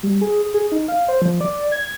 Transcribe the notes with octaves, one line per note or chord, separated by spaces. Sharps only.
G3
G#4
G#4
D#4
F5
C5
F3
D5
G#6